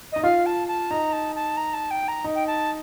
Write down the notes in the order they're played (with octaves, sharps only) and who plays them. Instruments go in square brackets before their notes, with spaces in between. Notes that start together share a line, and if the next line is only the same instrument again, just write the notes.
[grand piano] D#4 [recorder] D#5
[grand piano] F4 [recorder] F5
[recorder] A5
A5
[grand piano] D#4 [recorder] A#5
[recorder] A5
A5
A#5
A5
G5
A#5
[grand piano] D#4
[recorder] G5
A5